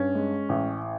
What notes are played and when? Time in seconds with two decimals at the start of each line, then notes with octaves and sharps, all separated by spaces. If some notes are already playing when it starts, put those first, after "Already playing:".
Already playing: G2 C#4
0.15 G#3
0.49 A1